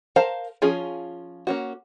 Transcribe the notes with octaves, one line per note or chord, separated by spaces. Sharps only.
A#4 C5 F5 A5 A#5
F3 C#4 F4 G#4
A#3 C#4 F#4